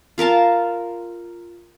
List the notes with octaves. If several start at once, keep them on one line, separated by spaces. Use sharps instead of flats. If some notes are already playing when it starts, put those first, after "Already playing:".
F4 A#4 F5 A5